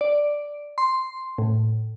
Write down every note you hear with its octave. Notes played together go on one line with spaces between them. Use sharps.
D5
C6
A2